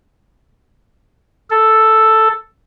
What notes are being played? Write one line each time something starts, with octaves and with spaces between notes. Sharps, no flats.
A4